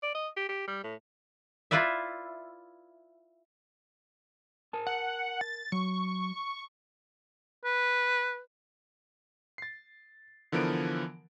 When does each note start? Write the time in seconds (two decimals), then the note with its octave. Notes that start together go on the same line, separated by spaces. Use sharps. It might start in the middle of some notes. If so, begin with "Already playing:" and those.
0.03 D5
0.15 D#5
0.37 G4
0.49 G4
0.67 G3
0.84 A2
1.71 E4 F4 B4 D5 E5
4.73 A#4 G#5 A5
4.87 F#5
5.41 A6
5.72 F#3 C#6
7.64 B4
9.58 A6 C7
10.52 D3 E3 F3 B3 A#4 D7